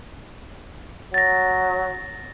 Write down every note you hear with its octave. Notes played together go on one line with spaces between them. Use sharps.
F#3 A6 A#6